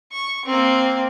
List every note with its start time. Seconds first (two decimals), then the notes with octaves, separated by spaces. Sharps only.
0.12 C#6
0.46 A#3 C4